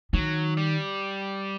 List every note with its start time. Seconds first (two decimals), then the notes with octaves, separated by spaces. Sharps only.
0.13 D#3 F#3
0.57 G3